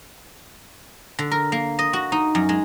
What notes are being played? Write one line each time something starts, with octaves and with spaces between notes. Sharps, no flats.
D3
A#4
A#3
D#5
F#4
D#4
F#2
G#3